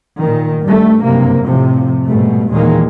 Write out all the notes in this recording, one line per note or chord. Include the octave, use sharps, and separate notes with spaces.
A#2 D#3
G2 G3 A3
F#1 G2 C3 A#3
F2 A2 C3 F3
G#2 B2 G3 A3
D#2 A#2 D#3 E3 G#3 A#3